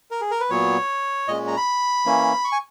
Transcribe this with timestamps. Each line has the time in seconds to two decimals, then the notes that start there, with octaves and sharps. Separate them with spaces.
0.11 A#4
0.21 G#4
0.31 A#4
0.40 B4
0.50 A#2 F#3 B3 C#5
1.28 A#2 G#3 C#4 D#5
1.48 A#5
1.57 B5
2.06 E3 A#3 C#4
2.45 C#6
2.52 G#5